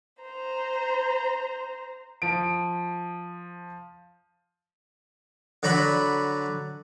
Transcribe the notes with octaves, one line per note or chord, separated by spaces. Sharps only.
C5 A#5
F3 D7
D3 F#3 A#5 B5